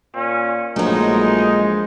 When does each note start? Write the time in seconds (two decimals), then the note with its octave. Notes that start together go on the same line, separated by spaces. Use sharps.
0.15 A#2 C#4
0.76 A#1 F#3 G#3 A3 D#4